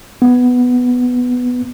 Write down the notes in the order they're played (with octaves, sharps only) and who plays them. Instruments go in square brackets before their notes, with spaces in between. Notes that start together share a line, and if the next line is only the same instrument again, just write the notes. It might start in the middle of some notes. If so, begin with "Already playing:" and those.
[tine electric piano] B3